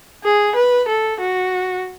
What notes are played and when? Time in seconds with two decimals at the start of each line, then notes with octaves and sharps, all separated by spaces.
0.25 G#4
0.56 B4
0.89 A4
1.20 F#4